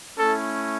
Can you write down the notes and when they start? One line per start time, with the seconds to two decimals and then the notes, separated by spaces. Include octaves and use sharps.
0.19 A3 C#4 E4 A4